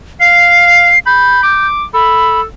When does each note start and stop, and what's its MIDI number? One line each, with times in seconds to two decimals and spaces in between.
0.20 0.94 77
0.20 0.99 96
1.06 1.40 83
1.06 1.67 91
1.43 1.84 86
1.94 2.44 69
1.94 2.41 83